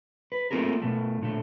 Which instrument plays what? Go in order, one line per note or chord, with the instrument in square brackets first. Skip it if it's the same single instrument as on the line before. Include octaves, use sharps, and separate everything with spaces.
[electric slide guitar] B4
A3 A#3 C4 F4 G#4 A#4
B2 A3
A#2 D3 A3